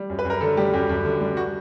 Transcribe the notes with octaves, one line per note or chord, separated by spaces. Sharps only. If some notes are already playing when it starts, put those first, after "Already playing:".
Already playing: G3
F#2
B4
F#2
A#4
D3 A4
G3 G4
F#2 G4
F#2
D3
G3
F#4